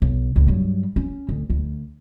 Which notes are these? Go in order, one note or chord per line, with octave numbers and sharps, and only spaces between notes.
B1
C#2 A2
G2 F#3
C#4
D2
D2